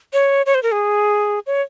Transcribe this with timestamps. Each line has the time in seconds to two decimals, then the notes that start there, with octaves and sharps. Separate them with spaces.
0.13 C#5
0.46 C#5
0.55 C5
0.63 A#4
0.72 G#4
1.47 C#5